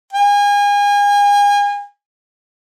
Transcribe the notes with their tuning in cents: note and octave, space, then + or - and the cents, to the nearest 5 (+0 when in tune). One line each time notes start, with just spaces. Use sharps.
G#5 -35